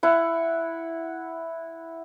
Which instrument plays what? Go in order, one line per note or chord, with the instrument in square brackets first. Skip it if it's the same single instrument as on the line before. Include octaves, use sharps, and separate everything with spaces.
[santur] E4 F#5